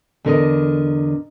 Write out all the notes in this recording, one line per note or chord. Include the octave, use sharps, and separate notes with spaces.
E2 D3 A#4 D#5